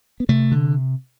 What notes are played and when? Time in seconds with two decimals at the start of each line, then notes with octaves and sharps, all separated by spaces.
0.20 B3
0.29 C3 A3
0.52 D3